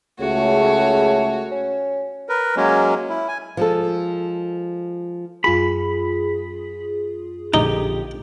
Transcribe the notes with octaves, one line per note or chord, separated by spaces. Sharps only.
C#2 C#3 A3 F#4 C#5
C#4
A#4 B4
F#3 G#3 A#3 C#4
E4
G#5
F3 G#3 A4
F#2 F4 G#4 B5
A#1 D3 D#4 G4